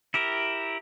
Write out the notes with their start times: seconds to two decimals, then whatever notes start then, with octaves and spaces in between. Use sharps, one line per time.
0.14 E4 G4 A#4